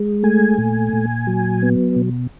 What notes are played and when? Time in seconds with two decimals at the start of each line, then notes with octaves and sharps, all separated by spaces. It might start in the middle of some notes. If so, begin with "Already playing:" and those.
Already playing: G#3
0.23 A3 G#5
0.58 A#2
0.93 A#2
1.27 F#3
1.62 B3
1.96 B2